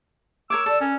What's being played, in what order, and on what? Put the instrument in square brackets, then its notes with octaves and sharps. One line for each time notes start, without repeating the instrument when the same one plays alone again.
[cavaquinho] A#4 C#5 D6 [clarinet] E6
[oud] G3 D5 [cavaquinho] A4
[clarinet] C#4 [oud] A#4